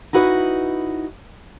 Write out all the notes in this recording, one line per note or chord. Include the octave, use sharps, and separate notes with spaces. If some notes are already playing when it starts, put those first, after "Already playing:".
D#4 E4 F#4 B4 D5 D#5